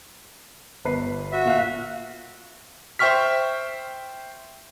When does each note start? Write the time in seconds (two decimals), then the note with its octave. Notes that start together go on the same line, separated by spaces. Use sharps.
0.85 G1 B4 C7
1.32 F#4 E5
1.45 A#2 F5 F#6
2.99 C5 E5 G5 C#6 F6 B6